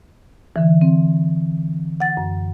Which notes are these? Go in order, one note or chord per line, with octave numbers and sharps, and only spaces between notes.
D3 E3
C4
F#5 A6
F#2